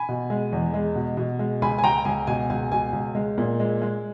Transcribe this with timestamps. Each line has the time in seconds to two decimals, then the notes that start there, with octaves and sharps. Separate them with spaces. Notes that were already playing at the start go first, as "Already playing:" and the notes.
Already playing: G#5 B5
0.09 B2
0.30 G#3
0.52 E2
0.74 G#3
0.95 B2
1.17 B2
1.39 G#3
1.61 C#2 G#5 B5
1.78 G#5
1.83 C#2 G5 A#5
2.05 C#2 G#5
2.27 B2 G#5
2.50 C#2 G#5
2.72 B2 G#5
2.93 C#2
3.15 G#3
3.38 A#2
3.60 G#3
3.82 G#3